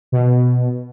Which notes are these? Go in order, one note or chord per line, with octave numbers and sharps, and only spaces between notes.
B2